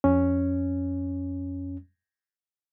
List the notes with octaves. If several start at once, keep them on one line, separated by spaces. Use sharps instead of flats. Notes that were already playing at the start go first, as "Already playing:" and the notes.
F2 C#4